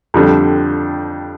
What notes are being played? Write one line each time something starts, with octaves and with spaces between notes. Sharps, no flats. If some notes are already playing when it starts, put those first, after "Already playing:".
F2 D3 G3 D4